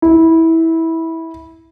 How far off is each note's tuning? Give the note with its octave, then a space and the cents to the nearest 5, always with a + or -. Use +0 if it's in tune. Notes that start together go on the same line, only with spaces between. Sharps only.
E4 -15